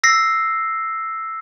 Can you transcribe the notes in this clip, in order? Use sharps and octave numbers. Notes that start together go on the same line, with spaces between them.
E6 A#6 C7